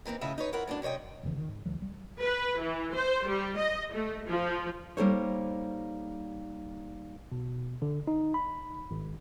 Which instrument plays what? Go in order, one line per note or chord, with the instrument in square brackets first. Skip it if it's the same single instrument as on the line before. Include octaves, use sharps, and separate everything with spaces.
[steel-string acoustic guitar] E3 A#3 C4 D#4
A2 C#3 F4 D#5 E5
D#4 B4 C#5
E4 F4 A#4 C#5 F#5
A2 D3 F#3 D4
F#2 C3 C#5 D#5 G5
[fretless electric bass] F1 E2 C#3 E3
D2 D#3
G#2
C#2 C#3 E3 F#3
B1 G3
[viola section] B4
E3
C5
G3
D#5
A3
F3
[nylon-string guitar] G3 A#3 D#4 A4 C5 C#5
[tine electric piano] B2
D3
D#4
B5
G#1